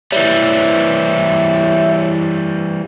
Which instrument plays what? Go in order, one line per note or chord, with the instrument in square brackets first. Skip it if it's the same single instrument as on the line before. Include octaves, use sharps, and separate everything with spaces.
[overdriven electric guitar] E3 G3 [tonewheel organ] C#5 E5